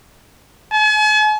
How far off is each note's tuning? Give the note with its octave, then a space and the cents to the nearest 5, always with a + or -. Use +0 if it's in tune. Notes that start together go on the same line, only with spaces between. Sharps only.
G#5 +45